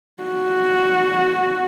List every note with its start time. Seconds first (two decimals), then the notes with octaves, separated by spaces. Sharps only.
0.23 F#4